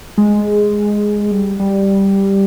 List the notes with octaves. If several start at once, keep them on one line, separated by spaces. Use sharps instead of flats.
G#3
G3
G3